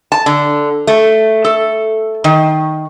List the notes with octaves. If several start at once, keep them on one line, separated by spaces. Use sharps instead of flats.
A5
D3
A3
A4
D#3